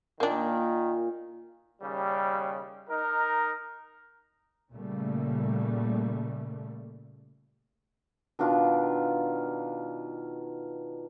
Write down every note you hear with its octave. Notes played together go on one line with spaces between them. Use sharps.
A#2 D#3 A#3 D4
D#2 C#3 G3
D#4 A#4
A#2 C#3 G3 A3 A#3
B2 D#3 D4 F4